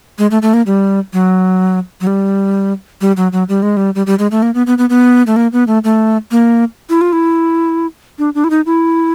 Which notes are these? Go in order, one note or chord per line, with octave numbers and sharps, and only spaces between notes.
G#3
A3
A3
A#3
G3
F#3
F#3
G3
G3
F#3
F#3
G3
G#3
G3
G3
G3
G#3
A3
A#3
B3
B3
B3
B3
A3
A#3
B3
A3
A3
A#3
E4
F4
E4
D4
D4
E4
D#4
E4